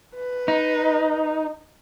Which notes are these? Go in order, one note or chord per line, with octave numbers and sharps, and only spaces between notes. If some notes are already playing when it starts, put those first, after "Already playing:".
B4
D#4